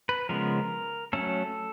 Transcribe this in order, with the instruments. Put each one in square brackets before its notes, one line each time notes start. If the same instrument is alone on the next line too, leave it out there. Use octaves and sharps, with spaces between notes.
[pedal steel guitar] B4
C#3 F3 G#3 B3 A#4
F#3 A3 C#4 A4